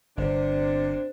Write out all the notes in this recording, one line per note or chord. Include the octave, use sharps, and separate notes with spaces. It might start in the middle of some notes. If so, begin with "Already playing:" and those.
G1 C3 D4 C5